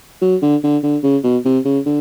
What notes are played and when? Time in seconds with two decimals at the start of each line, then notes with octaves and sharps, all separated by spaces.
0.22 F#3
0.42 D3
0.63 D3
0.83 D3
1.03 C#3
1.23 B2
1.45 C3
1.65 C#3
1.86 D3